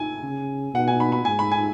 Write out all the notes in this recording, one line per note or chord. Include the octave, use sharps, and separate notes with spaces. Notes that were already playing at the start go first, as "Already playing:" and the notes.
Already playing: G#5
C#3
B2 F#5
G#5
B5
B5
G#2 G#5
B5
G#5